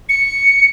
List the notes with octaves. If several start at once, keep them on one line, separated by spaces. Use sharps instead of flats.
C#7